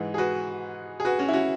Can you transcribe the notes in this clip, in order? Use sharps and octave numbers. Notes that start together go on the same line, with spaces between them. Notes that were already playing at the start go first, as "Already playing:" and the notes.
Already playing: G#2 E3
G#4
F#4 B4
G#4
F#4 B4
C#4 F#4
E4
C#4 F#4